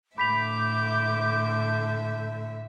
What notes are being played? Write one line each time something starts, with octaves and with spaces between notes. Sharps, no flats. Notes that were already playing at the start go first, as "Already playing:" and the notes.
A2 D3 E5 B5 D6 G6 B6 F7